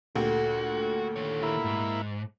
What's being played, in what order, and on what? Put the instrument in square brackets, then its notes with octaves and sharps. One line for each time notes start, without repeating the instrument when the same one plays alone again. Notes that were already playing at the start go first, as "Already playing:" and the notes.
[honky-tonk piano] D2 A#2 G4 [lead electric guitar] F#4 [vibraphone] A4
[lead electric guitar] D#3 C#5
[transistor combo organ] A#3 E4 B5
[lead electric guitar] G#2